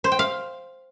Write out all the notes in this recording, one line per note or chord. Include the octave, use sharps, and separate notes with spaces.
C5
G5
F5